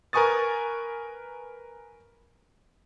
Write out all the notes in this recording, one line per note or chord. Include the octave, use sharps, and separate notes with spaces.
A#4 B4 G#5 C#6 D#6 A6